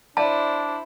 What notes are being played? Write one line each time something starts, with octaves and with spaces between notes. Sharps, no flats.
D4 E4 C5 D5 A5